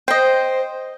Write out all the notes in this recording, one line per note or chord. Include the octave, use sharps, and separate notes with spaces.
C5 D#5 G5